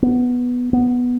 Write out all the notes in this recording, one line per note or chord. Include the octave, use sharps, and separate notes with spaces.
B3
B3